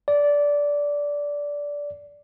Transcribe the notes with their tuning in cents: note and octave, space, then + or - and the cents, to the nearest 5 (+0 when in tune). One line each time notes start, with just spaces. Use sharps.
D5 -15